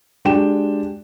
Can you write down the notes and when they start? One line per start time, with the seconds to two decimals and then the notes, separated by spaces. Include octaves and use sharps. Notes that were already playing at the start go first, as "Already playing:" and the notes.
0.25 G#3 D4 F#4 G4 G5 E7